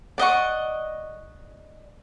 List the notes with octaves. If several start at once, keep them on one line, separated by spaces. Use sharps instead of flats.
D5 D#5 F#5 C#6